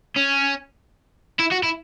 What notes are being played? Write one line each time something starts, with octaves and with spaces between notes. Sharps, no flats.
C#4
E4
F#4
E4